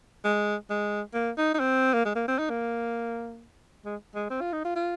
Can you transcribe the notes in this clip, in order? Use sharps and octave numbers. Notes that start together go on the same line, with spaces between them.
G#3
G#3
A#3
D#4
D#4
C4
A#3
G#3
A#3
C4
D#4
A#3
G#3
G#3
C4
F4
D#4
F4
F4